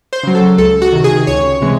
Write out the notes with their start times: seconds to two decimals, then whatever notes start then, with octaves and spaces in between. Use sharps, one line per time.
0.13 C5
0.23 C#3 F#3
0.35 A4
0.58 C#2 A4
0.82 F#4
0.93 C3 D#3
1.04 G#4
1.27 C#2 C#5
1.62 C3 E3 G#3